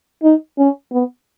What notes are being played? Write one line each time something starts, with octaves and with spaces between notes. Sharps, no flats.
D#4
C#4
B3